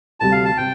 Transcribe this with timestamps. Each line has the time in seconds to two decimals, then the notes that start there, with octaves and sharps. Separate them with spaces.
0.20 D2 C3 G3 A5
0.32 F5
0.45 A5
0.57 C3 G5